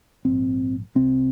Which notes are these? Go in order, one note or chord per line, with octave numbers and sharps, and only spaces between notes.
A#1 G#2 C4
C2 C3 C4